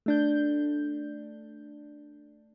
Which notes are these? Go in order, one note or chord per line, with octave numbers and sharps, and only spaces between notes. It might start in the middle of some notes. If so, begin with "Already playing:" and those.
A3 D4 G6